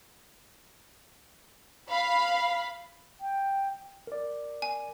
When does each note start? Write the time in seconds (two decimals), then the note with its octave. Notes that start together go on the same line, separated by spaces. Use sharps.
1.89 F5 B5
3.20 G5
4.07 A#4 D5
4.62 G#5